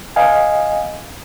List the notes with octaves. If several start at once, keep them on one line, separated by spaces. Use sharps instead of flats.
D#5 F5 G#5